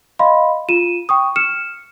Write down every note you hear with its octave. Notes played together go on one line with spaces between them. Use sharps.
D#5 F5 B5 C6
F4 D#7 E7
G5 C#6 D#6
F6 C#7 E7